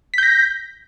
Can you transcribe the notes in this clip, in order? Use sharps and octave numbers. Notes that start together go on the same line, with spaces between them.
G6 A#6 B6